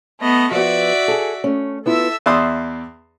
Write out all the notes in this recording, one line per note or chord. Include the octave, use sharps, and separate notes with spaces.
A3 B3 D#5
F3 B3 F#4 D5 E5
G#4 A4
A3 C#4
B3 E4 F4 A4 E5 E6
E2 D5 E5 C6 D#6